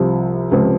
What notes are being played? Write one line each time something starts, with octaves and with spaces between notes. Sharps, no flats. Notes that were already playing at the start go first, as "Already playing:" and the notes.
Already playing: C2 C3 F3
C#2 C3 F3